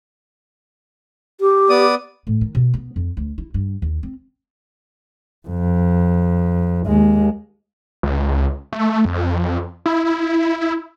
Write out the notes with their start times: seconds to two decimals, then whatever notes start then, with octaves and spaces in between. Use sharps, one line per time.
1.41 G4
1.70 B3 D5 D#6
2.27 A2
2.41 D#3
2.55 B2
2.74 B3
2.96 F2
3.17 D2
3.38 E4
3.54 G2
3.82 D#2
4.03 C4
5.48 F2
6.86 D#2 G#3
8.03 C#2
8.73 A3
9.05 F2
9.86 E4